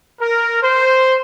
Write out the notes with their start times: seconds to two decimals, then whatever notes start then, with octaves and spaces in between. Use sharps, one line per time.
0.21 A#4
0.62 C5